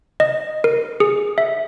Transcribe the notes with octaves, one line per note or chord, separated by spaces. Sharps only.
D#5
A#4
G#4
E5